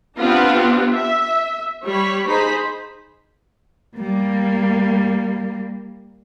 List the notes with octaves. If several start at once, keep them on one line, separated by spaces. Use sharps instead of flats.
B3 C4 D4 F4 G4 B4
E5
G3 C#5 B5
D#4 G#4 C5 B5
G3 A#3